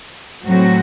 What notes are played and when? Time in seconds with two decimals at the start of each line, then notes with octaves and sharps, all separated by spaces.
0.46 A2 F#3 A3 C4 F#4